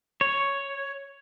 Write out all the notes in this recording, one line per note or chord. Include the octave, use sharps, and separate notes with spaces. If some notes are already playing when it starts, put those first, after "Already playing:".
C#5